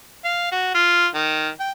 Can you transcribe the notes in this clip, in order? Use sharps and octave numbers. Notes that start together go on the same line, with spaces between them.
F5
F#4
F4
D#3
G5